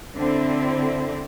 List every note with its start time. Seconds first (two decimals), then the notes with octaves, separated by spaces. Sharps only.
0.15 D3 C4 E4